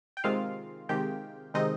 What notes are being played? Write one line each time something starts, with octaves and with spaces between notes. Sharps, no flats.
G5
C3 D#3 G#3 C4 F4 F5
C3 D#3 G#3 C4 G4 G5
C3 D#3 G#3 C4 D#4 D#5